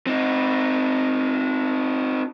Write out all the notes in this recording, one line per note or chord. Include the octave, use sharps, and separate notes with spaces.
C4 D#4